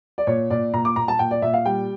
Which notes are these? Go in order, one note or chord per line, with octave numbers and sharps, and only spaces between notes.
D5
A#2 C#5
A#2 D5
A#2 A#5
D6
A#2 A#5
A5
A#2 G5
D5
A#2 E5
F5
G3 G5